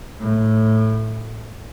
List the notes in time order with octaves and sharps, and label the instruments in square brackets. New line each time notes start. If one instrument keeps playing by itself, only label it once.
[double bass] A2